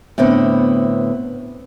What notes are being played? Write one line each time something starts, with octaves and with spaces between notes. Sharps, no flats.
A2 D3 B3 C4